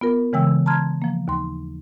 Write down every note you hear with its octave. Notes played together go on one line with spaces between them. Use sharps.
B3 F4 A#4
C#3 E3 G#3 G5 E6
A5 A#5 C6 F6 G#6
F3 A#3
D#2 C6